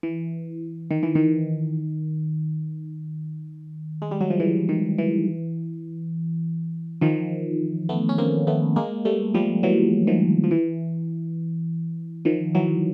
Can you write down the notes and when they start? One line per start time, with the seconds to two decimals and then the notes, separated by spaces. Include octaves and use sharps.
0.03 E3
0.91 D#3
1.03 E3
1.15 D#3
4.02 G#3
4.11 G3
4.21 F#3
4.30 F3
4.40 E3
4.69 D#3
4.98 E3
7.01 D#3 F3
7.89 A3 B3
8.09 C#4
8.18 A#3 C4
8.47 A3 B3
8.76 G#3 A#3
9.05 G3 A3
9.34 F3 G3
9.63 E3 F#3
10.07 D#3 F3
10.44 F3
10.51 E3
12.25 D#3 F3
12.55 E3 F#3